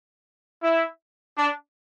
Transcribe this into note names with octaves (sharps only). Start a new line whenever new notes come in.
E4
D4